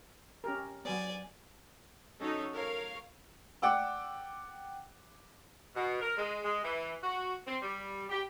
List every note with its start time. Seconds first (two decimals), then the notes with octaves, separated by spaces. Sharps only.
0.44 C#4 G4 A#4
0.85 F#3 B3 D5 G#5
2.20 F#3 C#4 D#4 A4 C#5 D#5
2.53 A#4 C#5 F5
3.62 D5 F#5 G5 D6 E6
5.75 B2
6.01 A#4
6.16 G#3
6.43 G#3
6.64 E3
7.03 F#4
7.47 C4
7.62 G3
8.09 G4